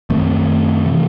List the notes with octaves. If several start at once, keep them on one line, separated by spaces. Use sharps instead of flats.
F#2 D#3 A3 C4
C3 E3